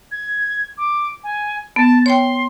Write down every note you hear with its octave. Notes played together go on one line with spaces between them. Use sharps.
G#6
D6
G#5
B3 A5
C#5 G5 C6